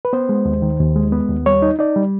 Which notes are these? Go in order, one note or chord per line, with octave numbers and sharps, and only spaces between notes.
B4
B3 C5
G#3
D#2
D#3
D#2
G#3
B3
D#2
G3 C#5
D#4
D#4 D5
G3